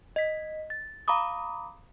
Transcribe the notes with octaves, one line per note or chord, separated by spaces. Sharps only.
D#5 B6
A6
F5 A#5 B5 D6 D#6